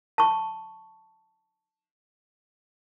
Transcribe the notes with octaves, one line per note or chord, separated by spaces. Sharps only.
A5 C#6